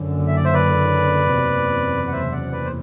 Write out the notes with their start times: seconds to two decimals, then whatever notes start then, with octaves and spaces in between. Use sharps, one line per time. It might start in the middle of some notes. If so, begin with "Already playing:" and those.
Already playing: F#1 F#2 D3
0.27 E5
0.36 D5
0.45 C5 E5
0.54 B4 D5
1.32 F#1 E2 C3
2.08 F#5
2.12 C5 E5
2.32 D5 F#5
2.52 B4 D5
2.65 C5